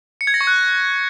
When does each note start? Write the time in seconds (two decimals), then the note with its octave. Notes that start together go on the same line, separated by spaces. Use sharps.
0.21 C#7
0.27 G#6
0.34 A#6
0.41 C#6
0.47 F#6